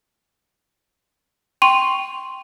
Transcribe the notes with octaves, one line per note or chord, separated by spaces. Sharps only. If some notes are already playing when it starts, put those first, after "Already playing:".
G5 C6 C#6 D#7 F7